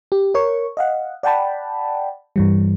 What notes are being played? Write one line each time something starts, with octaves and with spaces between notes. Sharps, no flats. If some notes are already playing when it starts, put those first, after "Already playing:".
G4
A#4 C#5 C#6
D#5 F5 F#5
D5 F#5 G5 A5 B5
G2 E3 G3